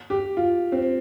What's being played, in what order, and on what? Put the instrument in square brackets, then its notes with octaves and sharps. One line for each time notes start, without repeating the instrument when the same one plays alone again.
[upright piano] G4
F4
C4